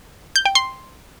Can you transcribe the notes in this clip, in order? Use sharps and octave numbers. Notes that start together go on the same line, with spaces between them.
G6
G5
C6